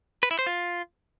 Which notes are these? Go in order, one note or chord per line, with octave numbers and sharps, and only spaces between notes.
B4
E4
C5
F4